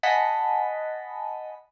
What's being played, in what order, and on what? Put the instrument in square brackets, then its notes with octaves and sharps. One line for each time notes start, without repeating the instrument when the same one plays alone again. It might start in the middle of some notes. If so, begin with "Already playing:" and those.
[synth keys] D#5 F#5 G#5 A5 B5 B6